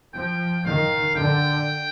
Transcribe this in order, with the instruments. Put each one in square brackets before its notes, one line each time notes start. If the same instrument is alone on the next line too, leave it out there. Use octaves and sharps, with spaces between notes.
[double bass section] F3 [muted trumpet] G5
[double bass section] D#3 [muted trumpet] F5
[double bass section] D3 [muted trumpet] G5